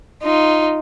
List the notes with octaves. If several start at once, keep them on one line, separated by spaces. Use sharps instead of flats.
D#4 F4